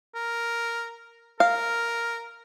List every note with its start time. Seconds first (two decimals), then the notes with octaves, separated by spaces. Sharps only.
0.15 A#4
1.40 A#4 F5